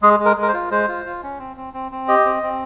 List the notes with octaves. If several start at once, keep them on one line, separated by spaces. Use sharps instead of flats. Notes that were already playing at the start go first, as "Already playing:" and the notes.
G#3 G#4
G#3
A#4
G#3
A#4
C5
F4
G#3 C5
F4
F4
C#4
C4
C4
C4
C4
G4 D#5
C4
C4